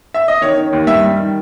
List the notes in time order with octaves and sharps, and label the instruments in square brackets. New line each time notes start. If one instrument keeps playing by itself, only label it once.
[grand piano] E5
D#5
D#3 C#5
D#3
D#2
G2 E5
G3
D#3